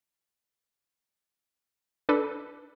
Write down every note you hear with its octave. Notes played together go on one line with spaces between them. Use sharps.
D4 A4 B4